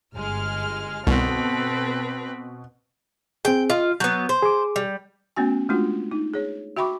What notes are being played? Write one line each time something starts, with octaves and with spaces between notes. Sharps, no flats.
G1 G#3 F6
C2 B2 C4 A4 B4
C4 G#4 G5
F4 D#5
F#3 B3 G6
C5
G#4 D6
G3
A3 B3 C#4 F#4 G#5
G#3 A3 D4 F4 F#4
D#4
G#4 C#5
F#4 E5 G5 B5 C#6 D6